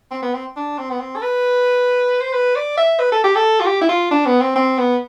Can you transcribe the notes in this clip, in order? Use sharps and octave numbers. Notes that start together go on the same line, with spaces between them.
C4
B3
C4
D4
C4
B3
C4
A4
B4
C5
B4
D5
E5
B4
A4
G4
A4
F4
G4
E4
F4
D4
B3
C4
C4
B3